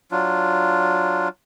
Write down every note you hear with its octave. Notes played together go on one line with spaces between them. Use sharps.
F#3 D4 F4